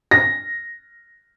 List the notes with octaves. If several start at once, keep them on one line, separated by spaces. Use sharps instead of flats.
A#6